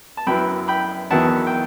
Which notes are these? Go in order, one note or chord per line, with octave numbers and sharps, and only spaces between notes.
A5
F#2 F#3 B3 E4 G5 B5
G5 B5
E2 D#3 F#3 B3 E4 F#5 A5
G5